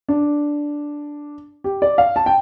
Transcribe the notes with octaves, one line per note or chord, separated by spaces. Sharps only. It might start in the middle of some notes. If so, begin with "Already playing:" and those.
D4
G4
D5
F5
A5
G5